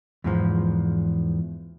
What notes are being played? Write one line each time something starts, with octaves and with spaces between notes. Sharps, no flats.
E2 G#2 F3